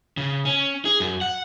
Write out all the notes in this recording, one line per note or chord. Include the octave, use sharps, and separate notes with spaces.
C#3
C#4
G#4
F#2
F#5